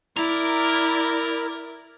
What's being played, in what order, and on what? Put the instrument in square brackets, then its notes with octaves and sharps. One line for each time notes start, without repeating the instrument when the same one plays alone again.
[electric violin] E4 D5 [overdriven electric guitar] A#4